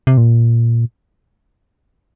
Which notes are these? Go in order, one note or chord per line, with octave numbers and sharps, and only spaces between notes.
C3
A#2